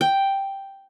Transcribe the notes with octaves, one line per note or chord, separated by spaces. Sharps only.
G5